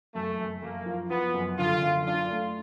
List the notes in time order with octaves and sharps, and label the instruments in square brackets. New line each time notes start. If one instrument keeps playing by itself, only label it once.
[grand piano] F#2 [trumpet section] A3
[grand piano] F#2
[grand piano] F#2 [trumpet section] A#3
[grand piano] F3
[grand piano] F3 [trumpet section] B3
[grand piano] F#2
[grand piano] D3 [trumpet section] F4
[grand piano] F#2
[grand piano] D4 [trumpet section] F4
[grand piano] A3